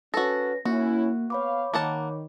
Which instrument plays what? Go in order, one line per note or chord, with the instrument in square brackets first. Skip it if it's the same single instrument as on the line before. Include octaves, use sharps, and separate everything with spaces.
[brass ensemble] C#4 B4 [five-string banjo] F#4 A4 [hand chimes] A#6
[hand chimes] A#3 [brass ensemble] C#4 E4 [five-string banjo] F#4
[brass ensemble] B3 B4 F5 [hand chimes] C#5 B5 D6
[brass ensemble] D#3 [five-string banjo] A#3 F#5 A5